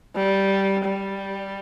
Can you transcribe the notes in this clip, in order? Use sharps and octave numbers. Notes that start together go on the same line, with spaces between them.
G3
G3